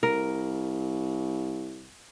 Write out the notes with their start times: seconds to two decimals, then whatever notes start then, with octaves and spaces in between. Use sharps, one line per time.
0.03 C2 A#4